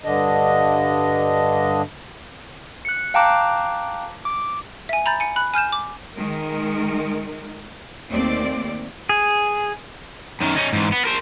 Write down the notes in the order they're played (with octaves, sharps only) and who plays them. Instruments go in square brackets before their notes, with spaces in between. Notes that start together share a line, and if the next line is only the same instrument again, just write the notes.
[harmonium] G2 D3 D4 D#5
[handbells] F#6 C#7
F5 G5 A5 A#5 D6 F#6
D6
[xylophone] E5 G#5
A#5 B5 G6 A6
G#5 C#7
B5 F#6
G#5 F6 G6 E7
D6
[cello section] D#3 G#3 A#4
D#2 A3 C4 D5
[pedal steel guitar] G#4
[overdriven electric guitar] F#2 D#3
C#4 D#4
G#2 E3
B3
A#4 C5